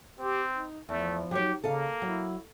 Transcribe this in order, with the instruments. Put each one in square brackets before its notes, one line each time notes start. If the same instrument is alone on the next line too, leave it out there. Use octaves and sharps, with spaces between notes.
[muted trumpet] C4 [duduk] G4
[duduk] D#4
[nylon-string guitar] E2 [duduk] F3 [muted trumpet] A3
[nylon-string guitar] F#3 D#4 C#5 [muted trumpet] G4
[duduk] C#3 [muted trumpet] A#3 [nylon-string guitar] A4 D#5 F5
[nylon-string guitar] F#3 [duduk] E4